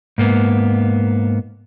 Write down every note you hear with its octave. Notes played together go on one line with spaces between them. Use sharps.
G#2 A#3 B3